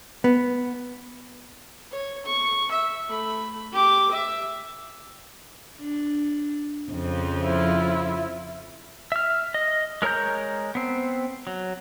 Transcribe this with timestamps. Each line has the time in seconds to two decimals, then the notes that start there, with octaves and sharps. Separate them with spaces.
0.24 B3
1.92 C#5
2.26 C#6
2.71 E5
3.09 A3 B5
3.72 G4 D6
4.11 E5
5.77 D4
6.92 F2 C#3 F3
7.45 E4 F4
9.12 E5 F6
9.54 D#5
10.02 G#3 A#4 C#5 A#5 G6
10.75 B3 C4
11.47 F#3